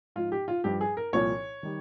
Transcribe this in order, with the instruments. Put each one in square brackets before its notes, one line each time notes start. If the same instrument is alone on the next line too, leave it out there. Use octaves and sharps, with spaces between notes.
[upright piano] G#2 F3 F4
G4
F4
G2 F3 G4
G#4
A#4
C2 A#2 F3 C#5
D#3 G3